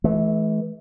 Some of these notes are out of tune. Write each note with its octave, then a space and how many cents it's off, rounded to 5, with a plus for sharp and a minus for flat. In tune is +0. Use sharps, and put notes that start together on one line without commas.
E3 -10 A3 -45